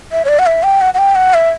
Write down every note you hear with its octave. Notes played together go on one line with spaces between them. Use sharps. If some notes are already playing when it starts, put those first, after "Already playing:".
E5
C#5
D5
F#5
E5
G5
F#5
F#5
G5
F#5
E5